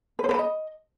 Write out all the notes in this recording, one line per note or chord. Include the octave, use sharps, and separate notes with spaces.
B4
C5
B4
B5
D#5